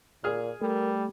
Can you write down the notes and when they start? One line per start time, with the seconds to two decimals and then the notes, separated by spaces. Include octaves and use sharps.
0.24 A#2 G#4 F6
0.61 G3 A3 A#4